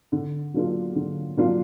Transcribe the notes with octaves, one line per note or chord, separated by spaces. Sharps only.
D3
F#3 A#3 D4 F4
D3
F#3 A#3 D4 F4